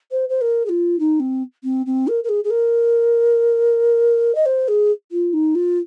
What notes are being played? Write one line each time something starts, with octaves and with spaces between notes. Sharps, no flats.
C5
C5
A#4
G#4
F4
D#4
C4
C4
C4
A#4
A#4
G#4
G#4
A#4
D#5
C5
G#4
F4
D#4
F4